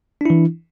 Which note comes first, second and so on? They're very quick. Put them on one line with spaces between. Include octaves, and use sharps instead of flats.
D4 E4 E3